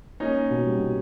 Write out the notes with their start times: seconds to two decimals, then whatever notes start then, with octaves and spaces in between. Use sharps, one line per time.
0.20 A#3 C#4 D#4
0.35 A#3
0.50 B2
0.65 G3
0.79 B2